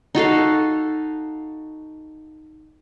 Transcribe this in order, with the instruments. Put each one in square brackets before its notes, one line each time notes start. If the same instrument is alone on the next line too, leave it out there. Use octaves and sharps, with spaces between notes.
[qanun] D#4 F#4 A4 F5